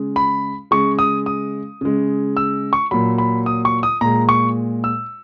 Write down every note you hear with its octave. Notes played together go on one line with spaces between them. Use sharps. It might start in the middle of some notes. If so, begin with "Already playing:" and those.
Already playing: C#3 G#3
B5
C#3 G#3 C#6
D#6
D#6
C#3 G#3
E6
C#6
A#2 F#3 B5
B5
D#6
C#6
D#6
A#2 G#3 A#5
C#6
E6